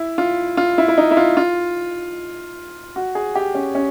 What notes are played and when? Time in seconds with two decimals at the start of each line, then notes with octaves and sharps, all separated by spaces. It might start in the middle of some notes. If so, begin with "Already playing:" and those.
Already playing: E4
0.18 F4
0.57 F4
0.78 E4
0.88 E4
0.98 D#4
1.11 E4
1.17 F4
1.37 F4
2.96 F#4
3.15 G#4
3.35 G4
3.55 C#4
3.75 C#4